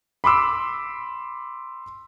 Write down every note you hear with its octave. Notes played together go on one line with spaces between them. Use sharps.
B5 C6 D6 E6